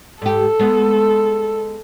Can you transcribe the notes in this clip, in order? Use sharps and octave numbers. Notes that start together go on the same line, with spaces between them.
G#2 G4 A4
G#3 B3